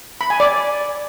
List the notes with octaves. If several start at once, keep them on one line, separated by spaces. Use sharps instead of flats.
B5
G#5
D5